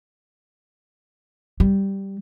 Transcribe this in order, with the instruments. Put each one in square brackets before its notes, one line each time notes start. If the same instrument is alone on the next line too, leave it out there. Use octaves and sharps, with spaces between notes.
[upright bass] G3